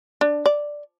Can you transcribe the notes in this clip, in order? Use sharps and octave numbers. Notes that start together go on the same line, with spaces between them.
D4
D5